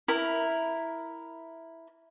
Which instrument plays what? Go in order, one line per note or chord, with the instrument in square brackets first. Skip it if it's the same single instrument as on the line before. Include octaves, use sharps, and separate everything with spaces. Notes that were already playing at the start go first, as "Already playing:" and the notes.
[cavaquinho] E4 A#4